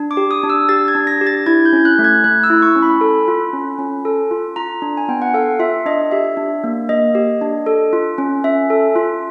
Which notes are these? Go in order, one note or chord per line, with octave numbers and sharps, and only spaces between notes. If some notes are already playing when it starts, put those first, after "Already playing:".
Already playing: D4
D6
G4
D#6
D4
E6
G4 A6
G#6
D4
A#6
G4
A6
E4 G#6
G6
C#4
F#6
A3
G#6
A3 F#6
E6
E4
C#6
C#4
B5
A4
F4
C#4
C#4
A4
F4
F4 A#5
D4
G#5
B3 G5
F#5
A4 F5
F4 E5
D4 D#5
G4 E5
D4
A#3
A#3 D#5
G4
D4
A4
F4
C#4
C#4 E5
A4
F4